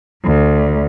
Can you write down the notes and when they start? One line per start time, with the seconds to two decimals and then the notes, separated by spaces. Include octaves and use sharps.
0.24 D2